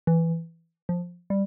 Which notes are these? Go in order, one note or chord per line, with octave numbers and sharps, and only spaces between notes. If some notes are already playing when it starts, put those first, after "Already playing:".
E3
F3
G3